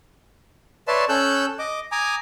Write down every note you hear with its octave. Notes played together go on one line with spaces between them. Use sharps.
B4 C#5 D5 E5 A5 C6
C#4 A4 E6 F#6 G6
D#5 D6
G#5 A#5 D6 D#6